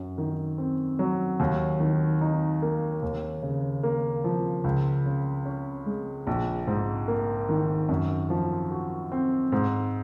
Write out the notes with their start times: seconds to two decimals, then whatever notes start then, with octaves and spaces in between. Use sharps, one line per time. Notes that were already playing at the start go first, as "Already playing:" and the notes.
Already playing: F#2
0.18 D#3
0.58 C4
0.99 F#3
1.40 D#2
1.80 D#3
2.21 D#4
2.62 A#3
3.03 D#2
3.43 C#3
3.83 A#3
4.24 F3
4.64 C#2
5.06 C#3
5.45 C#4
5.86 G#3
6.27 A#1
6.67 G#2
7.08 A#3
7.49 D#3
7.89 F#2
8.30 F3
8.71 F#4
9.12 C4
9.52 G#2